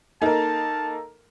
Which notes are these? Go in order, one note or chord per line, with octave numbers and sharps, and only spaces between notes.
A#3 D#4 A4 A#4 A5